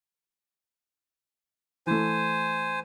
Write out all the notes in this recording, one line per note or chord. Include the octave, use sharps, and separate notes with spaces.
E3 A3 C5 G#5